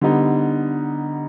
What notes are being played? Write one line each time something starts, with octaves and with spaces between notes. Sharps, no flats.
D3 G3 B3 D#4